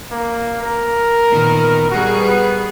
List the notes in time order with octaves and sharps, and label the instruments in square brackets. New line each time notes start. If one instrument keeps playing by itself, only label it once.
[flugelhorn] A#3
A#4
[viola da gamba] A#2 D#3 B3
[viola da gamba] G3 G#4 [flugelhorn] F#4
[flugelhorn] B3